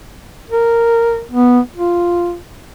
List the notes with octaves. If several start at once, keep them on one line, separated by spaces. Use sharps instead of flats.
A#4
B3
F4